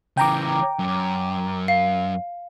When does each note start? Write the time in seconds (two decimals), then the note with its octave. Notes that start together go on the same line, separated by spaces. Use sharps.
0.17 C#3 E3 G5 A#5 D6
0.79 F#2
1.68 F5